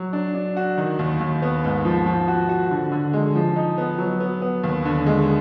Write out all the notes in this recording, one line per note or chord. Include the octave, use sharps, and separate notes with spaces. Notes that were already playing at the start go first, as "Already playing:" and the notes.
Already playing: F#3
D4
D4
F#4
D#3
D#2
D#2
B3
G#2
F3
F3
F#4
F#4
D3
D3
G#3
F3
D#4
B3
F#3
B3
B3
D#2
D3
G#3